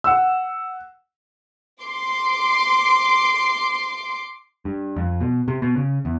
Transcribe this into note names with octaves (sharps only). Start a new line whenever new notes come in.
F#5 E6
C6 D6
G2
F2
B2
C3
B2
C#3
E2